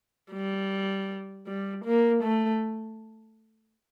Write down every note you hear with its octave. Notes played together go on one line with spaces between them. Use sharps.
G3
G3
A#3
A3